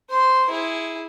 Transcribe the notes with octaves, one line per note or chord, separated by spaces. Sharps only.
C5 C6
E4 G#4